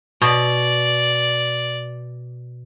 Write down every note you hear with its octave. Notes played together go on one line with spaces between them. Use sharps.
B2 D5